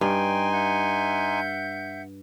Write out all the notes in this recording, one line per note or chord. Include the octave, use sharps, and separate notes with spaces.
G2 D#4 G5 G#5 C6
E5 F#5 G6